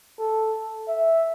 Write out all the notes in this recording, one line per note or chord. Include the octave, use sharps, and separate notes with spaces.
A4
E5